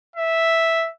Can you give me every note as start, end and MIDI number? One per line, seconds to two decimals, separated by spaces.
0.16 0.87 76